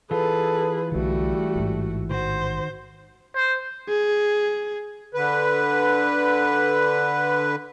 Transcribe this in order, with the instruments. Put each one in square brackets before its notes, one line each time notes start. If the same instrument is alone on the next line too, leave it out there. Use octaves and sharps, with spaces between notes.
[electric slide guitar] E3 F4 [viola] G#4 B4 [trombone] A4
[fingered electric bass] B1 D3 [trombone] G3 [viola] A3 F#4
[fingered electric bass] A1 G#2
[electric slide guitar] D#3 F#4 [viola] C5
[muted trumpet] C5
[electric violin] G#4
[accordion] D3 B4